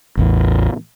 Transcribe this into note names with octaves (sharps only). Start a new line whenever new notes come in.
A1 E2